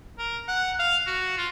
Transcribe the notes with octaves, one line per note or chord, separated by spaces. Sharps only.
A#4
F#5
F5
F#4
F4